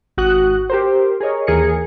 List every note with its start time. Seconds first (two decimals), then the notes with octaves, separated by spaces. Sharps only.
0.17 G#1 F#4 D#6 F#6
0.70 G4 A#4 C5
1.21 G#4 A#4 C#5 D#5
1.47 D#2 E3 G#4 A#4 C#7